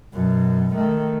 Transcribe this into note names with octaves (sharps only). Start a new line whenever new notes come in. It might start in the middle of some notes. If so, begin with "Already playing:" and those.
F#2 B2
D#3 A3